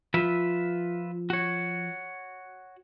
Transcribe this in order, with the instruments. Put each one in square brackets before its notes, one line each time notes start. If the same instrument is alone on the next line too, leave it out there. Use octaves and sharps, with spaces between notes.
[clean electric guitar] F3 [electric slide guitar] F4 B4 E5
[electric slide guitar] F#4 C#5